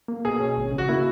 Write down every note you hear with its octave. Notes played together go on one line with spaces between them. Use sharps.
A#3
B2 G#4
C#4
G#1
C#3
F#4
A#3 E4